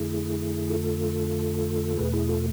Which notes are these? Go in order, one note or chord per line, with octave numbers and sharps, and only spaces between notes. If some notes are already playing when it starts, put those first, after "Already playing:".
Already playing: F2 D3 A3 E4 G#4
F4 A4
E2 B2 A3 G#4 B4
E4 G#4
F4 A4